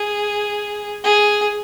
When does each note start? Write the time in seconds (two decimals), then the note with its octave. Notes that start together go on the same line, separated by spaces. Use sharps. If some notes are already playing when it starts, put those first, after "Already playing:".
Already playing: G#4
1.04 G#4